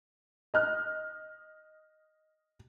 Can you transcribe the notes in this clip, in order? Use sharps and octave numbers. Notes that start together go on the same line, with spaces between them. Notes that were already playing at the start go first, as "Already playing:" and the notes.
D#5 F6 F#6